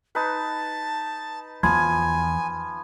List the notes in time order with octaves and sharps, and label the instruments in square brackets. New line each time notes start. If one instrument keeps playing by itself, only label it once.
[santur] D#4 B4 [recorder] A5
[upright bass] E2 [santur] F3 [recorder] G#5 [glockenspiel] B5 C6 G#6